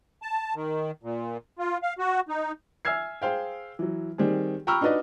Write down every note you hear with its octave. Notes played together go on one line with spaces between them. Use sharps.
A5
D#3
A#2
F4
F5
F#4
D#4
E5 G#5 E6 F6 G#6 C7
G#4 C5 F5 G5
E3 F#3
D#3 G3 C4 G#4
G5 A#5 B5 C#6 E6 F6
D4 D#4 F#4 B4 D5 D#5